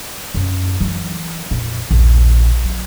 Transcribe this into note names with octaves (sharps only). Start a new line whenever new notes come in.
F#2
E3 F#3
F2 A#2
A#1 D#2
F#3